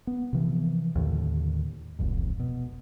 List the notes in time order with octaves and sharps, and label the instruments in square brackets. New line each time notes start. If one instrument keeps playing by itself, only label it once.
[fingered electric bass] B3
C3 E3 F3
D#2 A2 D3
E1 C2 F2 G#2
B2